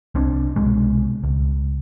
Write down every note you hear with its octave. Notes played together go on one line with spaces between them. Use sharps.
C2 C4 D4
C2 B2 G#3
C#2